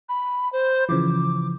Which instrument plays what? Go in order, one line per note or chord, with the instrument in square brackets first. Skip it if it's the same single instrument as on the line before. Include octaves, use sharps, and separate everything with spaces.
[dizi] B5
C5
[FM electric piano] C#3 E3 F3 [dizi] D6